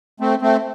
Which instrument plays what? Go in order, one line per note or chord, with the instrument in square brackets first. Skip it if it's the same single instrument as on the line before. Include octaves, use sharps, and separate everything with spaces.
[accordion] A3 C4
A3 C4